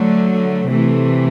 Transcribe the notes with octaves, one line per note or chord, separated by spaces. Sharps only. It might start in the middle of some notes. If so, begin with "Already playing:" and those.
Already playing: D3 F#3 A3
C3 E3 A3